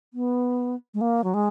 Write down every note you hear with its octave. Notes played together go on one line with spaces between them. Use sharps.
B3
G#3
A#3
F#3
G#3